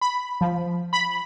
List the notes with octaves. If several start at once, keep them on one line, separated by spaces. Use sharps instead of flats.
B5
F3
B5